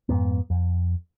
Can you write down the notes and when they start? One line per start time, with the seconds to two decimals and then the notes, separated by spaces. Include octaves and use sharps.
0.09 F2 G#2 B3
0.50 F2